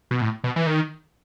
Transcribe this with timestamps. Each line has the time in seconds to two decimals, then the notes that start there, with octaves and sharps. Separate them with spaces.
0.11 B2
0.22 A2
0.44 B2
0.56 E3
0.67 D#3